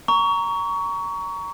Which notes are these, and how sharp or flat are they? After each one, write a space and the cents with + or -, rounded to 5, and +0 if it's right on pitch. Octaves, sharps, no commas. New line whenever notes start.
A#5 +0 C#6 +25